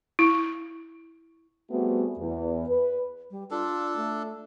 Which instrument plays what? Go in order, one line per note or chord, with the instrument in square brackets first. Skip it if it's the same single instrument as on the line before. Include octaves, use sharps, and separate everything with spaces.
[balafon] E4
[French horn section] G3 A3 B3 C4 F#4 G#4
E2
B4
[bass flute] G3
[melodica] D4 A4 [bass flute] F4
[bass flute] A3